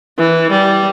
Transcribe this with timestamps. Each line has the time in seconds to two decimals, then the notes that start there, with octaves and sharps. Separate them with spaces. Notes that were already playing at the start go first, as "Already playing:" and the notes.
0.18 E3
0.51 G3